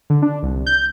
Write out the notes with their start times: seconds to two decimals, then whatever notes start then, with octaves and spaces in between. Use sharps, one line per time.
0.10 D3
0.22 D4
0.43 C2
0.66 G6